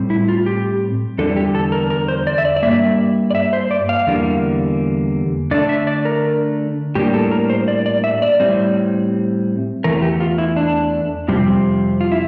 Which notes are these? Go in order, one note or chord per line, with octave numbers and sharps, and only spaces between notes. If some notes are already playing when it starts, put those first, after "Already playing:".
Already playing: A2 G3 C4
E4
F4
G4
E2 D3 G3 A4
G4
A4
A#4
A#4
C5
D5
E5
D5
D5
G2 E3 A#3 E5
D5
E5
C5
D5
F5
E2 D3 G3 A#3
D3 A3 D4 D5
E5
D5
A#4
A2 G3 A#3 D4 G4
A4
A#4
C5
D5
D5
E5
D5
A2 G3 C4
E2 E3 A3 A#4
G4
F4
E4
D4
F2 C3 G3 C4
F4
E4